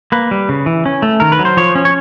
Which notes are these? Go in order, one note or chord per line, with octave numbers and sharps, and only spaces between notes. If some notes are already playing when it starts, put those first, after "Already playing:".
A#3 B4
G3
C#3
E3
C#4
A3
D#3 A#4
B4
F#3
C5
F3 C#5
C#4
C#5